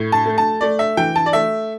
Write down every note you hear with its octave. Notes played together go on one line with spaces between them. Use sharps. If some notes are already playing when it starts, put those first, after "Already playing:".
Already playing: A2
A5
A3
A5
A3 D5
E5
E3 G5
A5
D5
A3 E5